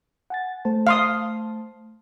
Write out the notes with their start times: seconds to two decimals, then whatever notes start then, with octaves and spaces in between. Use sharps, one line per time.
0.30 F#5 G#5 A6
0.65 A3 C5 A5
0.87 F5 C6 D#6